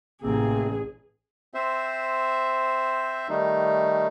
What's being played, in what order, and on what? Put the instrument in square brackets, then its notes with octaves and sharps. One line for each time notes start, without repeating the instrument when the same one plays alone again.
[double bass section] A1 [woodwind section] C3 A#3 C4 [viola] G#4
[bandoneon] C4 C5 E5
D#3 G3 A3 D#4